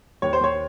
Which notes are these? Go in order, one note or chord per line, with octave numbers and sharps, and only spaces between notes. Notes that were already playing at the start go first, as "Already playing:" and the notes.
D#2 C#5
C5
D#2 C#5